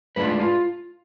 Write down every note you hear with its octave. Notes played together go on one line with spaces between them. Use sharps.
A2 G#3 D4 F4 B4
F4